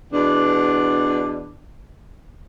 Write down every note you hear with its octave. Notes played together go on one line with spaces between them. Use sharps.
E2 B2 D4